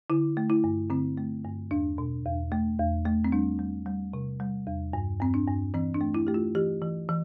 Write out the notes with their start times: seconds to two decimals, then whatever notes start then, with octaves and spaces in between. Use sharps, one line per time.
0.10 D3 E4
0.37 A3
0.50 E4
0.64 G2
0.90 D3 C4
1.18 A3
1.44 G2
1.71 E2 D4
1.98 B2
2.25 E2
2.52 A3
2.79 E2
3.06 A3
3.24 C4
3.32 G3 D4
3.59 G3
3.86 G3
4.13 C3
4.40 G3
4.67 E2
4.93 G2
5.20 G2 C4
5.34 D4
5.47 G2
5.74 E3 C4
5.95 D4
6.01 A3
6.15 E4
6.27 A3 G4
6.34 F4
6.55 E3 G4
6.82 E3
7.09 E3